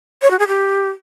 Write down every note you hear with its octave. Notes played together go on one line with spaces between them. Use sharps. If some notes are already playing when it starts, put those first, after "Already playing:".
C#5
F#4
G#4
G4